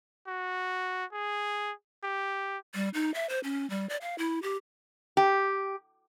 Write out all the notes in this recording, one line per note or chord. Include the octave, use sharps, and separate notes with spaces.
F#4
G#4
G4
G3
D#4
E5
C5
C#4
G3
D5
F5
E4
G4
G4